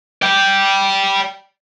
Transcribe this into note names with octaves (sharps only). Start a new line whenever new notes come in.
D5 G5